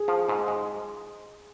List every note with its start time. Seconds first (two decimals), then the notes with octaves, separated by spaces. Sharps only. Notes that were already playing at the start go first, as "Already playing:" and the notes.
Already playing: G#4
0.08 F3
0.28 G#2
0.48 G#3